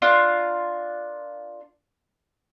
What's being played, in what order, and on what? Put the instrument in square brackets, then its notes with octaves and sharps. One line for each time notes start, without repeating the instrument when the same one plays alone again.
[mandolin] D4 F4 A#4